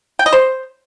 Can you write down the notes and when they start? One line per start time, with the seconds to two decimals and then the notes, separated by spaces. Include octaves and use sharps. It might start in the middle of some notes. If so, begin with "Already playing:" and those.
0.19 G5
0.26 D#5
0.33 C5